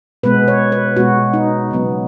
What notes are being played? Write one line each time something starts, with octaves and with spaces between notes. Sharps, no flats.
B2 G#3 B3 B4
C#5
B4
B2 G#3 B3 F#4
D#4
C#3 F#3 B3